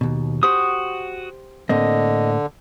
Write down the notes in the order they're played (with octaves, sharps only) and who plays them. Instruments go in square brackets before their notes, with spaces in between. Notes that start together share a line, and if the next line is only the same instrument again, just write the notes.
[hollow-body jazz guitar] D#2 B2
[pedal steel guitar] F#4 D#6 [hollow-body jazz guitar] G4 C5
[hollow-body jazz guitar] A2 A#3 C4 [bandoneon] D3 [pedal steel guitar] D#5